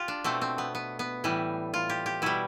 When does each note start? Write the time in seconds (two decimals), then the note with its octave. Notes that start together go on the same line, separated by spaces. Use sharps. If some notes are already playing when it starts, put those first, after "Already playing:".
Already playing: F4 G4
0.08 D4
0.24 B2 A3 C4
0.41 C4
0.58 B3
0.75 B3
0.99 B3
1.24 A2 E3 G3
1.74 F4
1.89 G4
2.06 G4
2.22 B2 G3 E4